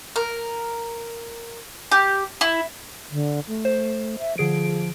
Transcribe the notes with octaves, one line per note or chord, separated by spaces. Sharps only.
A#4
G4
E4
D3
A3
C5
E5
D3 F3 G#4 D7